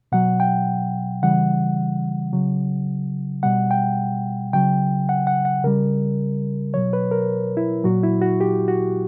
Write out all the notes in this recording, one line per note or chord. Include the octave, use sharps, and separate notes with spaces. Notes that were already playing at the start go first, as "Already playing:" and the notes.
B2 F#3 F#5
G5
C#3 E3 G3 F#5
C#3 F#3
B2 G3 F#5
G5
C#3 F#3 G5
F#5
F#5
F#5
C#3 G3 A#4
B2 F#3 C#5
B4
A#4
E4
A#2 F#3 F#4
E4
F#4
G4
F#4